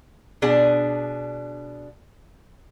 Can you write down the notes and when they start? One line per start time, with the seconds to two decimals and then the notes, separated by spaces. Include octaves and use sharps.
0.42 B2 D4 G#4